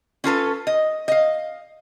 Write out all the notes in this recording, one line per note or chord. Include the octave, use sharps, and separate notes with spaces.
C#4 F4 A4 B4
D#5
D#5 F5